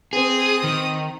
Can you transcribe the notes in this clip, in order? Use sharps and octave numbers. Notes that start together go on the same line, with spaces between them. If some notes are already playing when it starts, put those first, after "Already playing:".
C4 G#4 D#6
D#3